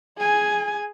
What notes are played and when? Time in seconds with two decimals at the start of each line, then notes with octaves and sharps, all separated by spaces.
0.18 G#4 G#5